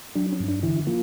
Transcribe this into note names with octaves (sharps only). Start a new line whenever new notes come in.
F#3 D4
C#4
G2
D4
D3 E3 E4
F3 A#3 F4